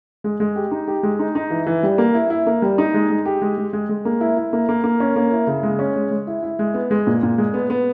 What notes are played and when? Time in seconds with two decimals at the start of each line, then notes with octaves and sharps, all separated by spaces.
0.24 G#3
0.40 G#3
0.56 G4
0.71 D#4
0.88 G4
1.03 G#3
1.19 D#4
1.35 D#4
1.50 E3
1.67 E3
1.83 G3
1.98 A#3
2.14 E4
2.30 E4
2.46 A#3
2.62 G3
2.78 D#4
2.94 G#3
3.10 G#3
3.26 G4
3.42 G#3
3.58 G#3
3.73 G#3
3.89 G#3
4.05 A#3
4.21 E4
4.37 E4
4.53 A#3
4.69 A#3
4.84 A#3
5.00 C#4
5.16 A#3
5.32 E4
5.47 C#3
5.63 G#3
5.79 C#4
5.96 G#3
6.11 G#3
6.27 E4
6.43 E4
6.59 G#3
6.74 B3
6.91 G#3
7.07 A#2
7.23 A#2
7.38 G#3
7.54 B3
7.70 B3